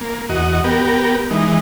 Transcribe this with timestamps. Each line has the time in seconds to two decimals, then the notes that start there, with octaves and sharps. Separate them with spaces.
0.01 A#3
0.29 E2 F#4 D#5
0.64 B3 G4 A#4
1.31 E3 G#3 D#4